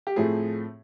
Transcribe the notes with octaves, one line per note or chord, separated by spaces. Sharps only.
G4
A2 F3 A3 C4 G#4